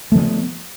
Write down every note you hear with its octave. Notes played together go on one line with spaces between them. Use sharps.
F3 A3 B3